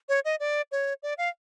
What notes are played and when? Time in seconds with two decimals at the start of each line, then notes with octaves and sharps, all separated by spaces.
0.09 C#5
0.25 D#5
0.40 D5
0.72 C#5
1.03 D5
1.18 F5